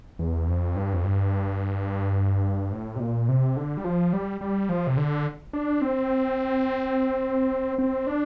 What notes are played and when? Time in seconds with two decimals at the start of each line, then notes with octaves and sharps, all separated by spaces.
0.19 E2
0.47 F2
0.76 G2
0.93 F2
1.04 G2
2.72 A2
2.95 C3
3.00 A#2
3.29 C3
3.57 D3
3.77 G3
3.84 F3
4.13 G3
4.41 G3
4.69 F3
4.87 C3
4.97 D3
5.53 D4
5.82 C4
7.78 C4
8.07 D4